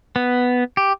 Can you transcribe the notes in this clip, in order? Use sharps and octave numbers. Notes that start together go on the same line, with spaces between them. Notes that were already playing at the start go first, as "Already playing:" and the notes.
B3
G4